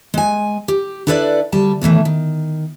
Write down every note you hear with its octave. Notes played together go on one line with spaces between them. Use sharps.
G#3 G#5
G4
D4 E4 A4 B4 C#5 D5
D2 G3 A5
B2 D#3 E3 A3
D#3